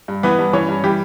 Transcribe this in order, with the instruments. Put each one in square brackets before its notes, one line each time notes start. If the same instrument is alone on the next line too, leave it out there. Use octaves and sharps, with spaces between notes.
[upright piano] G2
E3 B3 B4
G2
E3 C#4 C#5
G2
E3 G3 G4